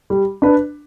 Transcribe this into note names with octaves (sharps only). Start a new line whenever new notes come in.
G3
D4 B4